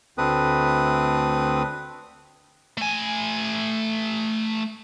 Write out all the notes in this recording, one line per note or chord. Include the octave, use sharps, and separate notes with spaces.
D2 A3 C4 B4 D#6
A3 G#5